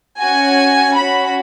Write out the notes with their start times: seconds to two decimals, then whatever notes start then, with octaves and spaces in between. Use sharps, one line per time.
0.22 C#4 F#4 G#5
0.95 C#4 F#4 B5